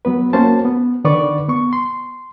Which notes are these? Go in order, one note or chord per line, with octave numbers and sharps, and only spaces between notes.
F#3 B3 B4
A#3 C#4 F#4 C5 A5
B3
D3 D#3 B4 D5 C#6 D6
B3 C#6
C6